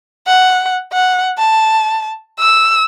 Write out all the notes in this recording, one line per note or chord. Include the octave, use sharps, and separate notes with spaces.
F#5
F#5
A5
E6